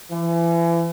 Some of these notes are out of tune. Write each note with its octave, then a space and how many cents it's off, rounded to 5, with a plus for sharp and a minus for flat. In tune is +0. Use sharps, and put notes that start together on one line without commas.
E3 +35